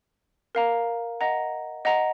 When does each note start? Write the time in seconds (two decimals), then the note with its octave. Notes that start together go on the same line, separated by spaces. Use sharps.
0.55 A#4 F5 A#5
1.21 D#5 F#5 A#5
1.85 D#5 F#5 A#5